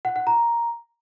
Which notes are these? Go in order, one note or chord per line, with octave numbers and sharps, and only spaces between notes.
F#5
F#5
A#5